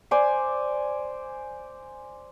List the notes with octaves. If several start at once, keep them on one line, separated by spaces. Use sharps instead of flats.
C5 D5 G#5 C6